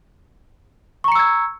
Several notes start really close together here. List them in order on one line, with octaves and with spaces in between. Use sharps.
C#6 A#5 C#7 E6 G#6